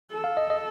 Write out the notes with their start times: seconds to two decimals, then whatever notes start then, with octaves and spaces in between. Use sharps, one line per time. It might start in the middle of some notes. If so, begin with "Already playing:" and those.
0.11 A4
0.24 F5
0.37 D#5
0.50 D#5